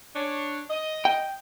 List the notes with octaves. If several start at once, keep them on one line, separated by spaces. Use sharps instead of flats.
D4 C#5
D#5
G5